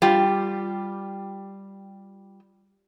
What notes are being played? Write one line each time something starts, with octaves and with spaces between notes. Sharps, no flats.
G3 F4 G4